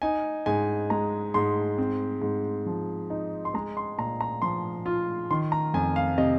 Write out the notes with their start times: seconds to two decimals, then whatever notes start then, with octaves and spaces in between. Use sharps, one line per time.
0.02 D#4 G#5
0.46 G#2 G#5
0.90 G#3 A#5
1.34 G#2 C6
1.78 C4
2.22 G#2
2.66 F3
3.10 D#4
3.45 C6
3.54 G#3 A#5
3.77 C6
3.98 A#2 A#5
4.21 A#5
4.42 F3 C6
4.86 F4
5.31 D#3 C6
5.52 A#5
5.74 F2 G#5
5.96 F5
6.18 C3 D#5